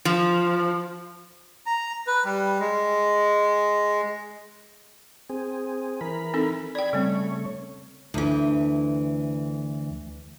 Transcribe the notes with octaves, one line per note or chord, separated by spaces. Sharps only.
F3
A#5
B4
G3
G#3
C4 G#4
E3 A#4 B5
C4 D#4 A4
D5 G5 B5 G#6
C#3 G3 A3 C4 C#5
D2 E3